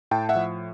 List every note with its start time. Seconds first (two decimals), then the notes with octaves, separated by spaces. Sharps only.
0.11 A2 G5 A5
0.29 E5 F#5
0.35 F3